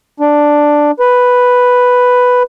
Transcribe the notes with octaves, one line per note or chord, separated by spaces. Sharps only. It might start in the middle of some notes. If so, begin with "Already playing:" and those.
D4
B4